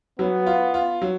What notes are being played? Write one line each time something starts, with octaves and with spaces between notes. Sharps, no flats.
F#3 B3
F4
F4
F#3